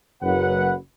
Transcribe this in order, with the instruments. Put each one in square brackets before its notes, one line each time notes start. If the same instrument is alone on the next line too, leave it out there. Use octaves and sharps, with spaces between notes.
[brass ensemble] F#1 F#2 B4 F#5